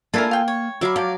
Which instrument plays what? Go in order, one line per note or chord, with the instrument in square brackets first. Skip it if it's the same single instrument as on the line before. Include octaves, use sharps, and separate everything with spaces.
[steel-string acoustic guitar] A#3 [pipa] D4 E4 A#4 [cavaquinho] F4 A4 G#5
[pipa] F5 G5
[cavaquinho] C#5
[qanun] F#3 D6 [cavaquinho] E5 F5 B5
[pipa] F3 [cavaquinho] D5 [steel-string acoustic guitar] F5